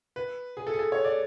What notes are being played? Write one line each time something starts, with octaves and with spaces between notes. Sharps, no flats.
B4
G#4
A4
G#4
A4
C#5
D5